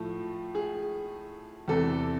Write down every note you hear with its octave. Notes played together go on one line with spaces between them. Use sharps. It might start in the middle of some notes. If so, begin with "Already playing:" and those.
Already playing: A2 F3 A3
G#4
E2 C3 E3 A4